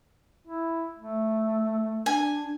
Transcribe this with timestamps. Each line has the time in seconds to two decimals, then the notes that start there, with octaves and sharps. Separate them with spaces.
0.47 E4
0.99 A3
2.06 D4 G#5